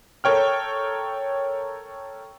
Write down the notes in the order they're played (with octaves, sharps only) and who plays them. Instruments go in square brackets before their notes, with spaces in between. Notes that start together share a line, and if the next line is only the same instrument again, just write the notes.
[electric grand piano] A4 A#4 C#5 G5 F6